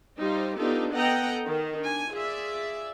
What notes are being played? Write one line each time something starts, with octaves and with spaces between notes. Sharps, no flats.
G3 D#4 F4 C5
B3 D4 D#4 F4 G4 A4
B3 A4 D#5 F#5 G5 A#5
D#3 A#4
D4 G#5
F4 G#4 D5 E5